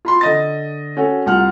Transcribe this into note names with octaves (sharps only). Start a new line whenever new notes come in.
F4 B5 C6
D3 D#5 A6
C#4 F#4 A4
C2 F4 F#5 F6